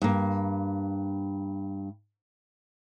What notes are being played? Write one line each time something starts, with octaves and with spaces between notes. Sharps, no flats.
G2 A#3